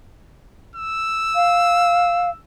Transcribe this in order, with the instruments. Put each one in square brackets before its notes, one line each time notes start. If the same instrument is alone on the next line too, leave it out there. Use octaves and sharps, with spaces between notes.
[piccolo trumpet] E6
[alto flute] F5